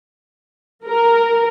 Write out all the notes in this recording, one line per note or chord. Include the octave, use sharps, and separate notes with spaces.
A#4